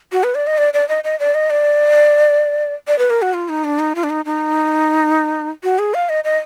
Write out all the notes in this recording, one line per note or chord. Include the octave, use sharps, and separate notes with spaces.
F#4
B4
D5
D#5
D5
D5
D#5
D#5
D5
D#5
D5
D5
B4
A#4
F#4
F4
D#4
D4
D#4
F4
D4
D#4
D#4
F#4
G#4
F5
D#5
D#5